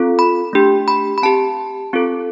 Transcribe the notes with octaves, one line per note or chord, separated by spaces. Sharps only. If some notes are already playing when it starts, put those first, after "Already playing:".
Already playing: C4 F4 A4
B5
A3 D4 G4
B5
B5
C4 G4 A5
C4 F4 A4